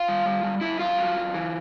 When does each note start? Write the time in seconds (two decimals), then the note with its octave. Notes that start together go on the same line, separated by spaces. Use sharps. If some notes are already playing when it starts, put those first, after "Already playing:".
Already playing: F4 F5
0.08 G3
0.26 G3
0.43 G3
0.61 F#2 E4 E5
0.79 F#2 F4 F5
0.98 F#3
1.16 F#2
1.34 E3